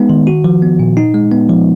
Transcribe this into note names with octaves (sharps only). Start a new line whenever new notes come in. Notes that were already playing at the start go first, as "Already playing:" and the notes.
Already playing: G#3 B3 D#4
D#3
F#4
F3
B3
A#2
D#4
G#3
B3
F3